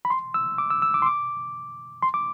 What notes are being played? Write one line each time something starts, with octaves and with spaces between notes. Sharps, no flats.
B5
C6
E6
D6
E6
E6
D6
C6
D6
C6
D6